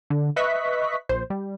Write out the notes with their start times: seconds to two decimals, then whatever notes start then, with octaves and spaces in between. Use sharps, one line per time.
0.10 D3
0.36 B4 D#5 E5 C#6 F#6 B6
1.09 A#1 C5
1.30 G3